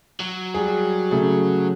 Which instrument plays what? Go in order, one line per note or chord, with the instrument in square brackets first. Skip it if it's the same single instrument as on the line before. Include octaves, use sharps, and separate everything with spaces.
[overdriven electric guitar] F#3
[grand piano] G3 G#4
C#3 A3 G#4